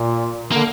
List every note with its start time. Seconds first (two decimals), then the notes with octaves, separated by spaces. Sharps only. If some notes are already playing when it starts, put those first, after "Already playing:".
Already playing: A#2
0.52 D3 A#3